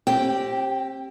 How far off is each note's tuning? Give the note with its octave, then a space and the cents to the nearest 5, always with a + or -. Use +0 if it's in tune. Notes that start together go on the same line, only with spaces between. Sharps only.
C4 +35 G4 +0 G5 -10